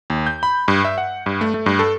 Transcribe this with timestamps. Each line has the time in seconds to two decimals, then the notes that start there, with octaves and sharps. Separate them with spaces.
0.10 D#2
0.26 G6
0.43 B5
0.68 G2
0.85 E5
0.98 F#5
1.26 G2
1.41 A3
1.54 A3
1.66 G2
1.79 A4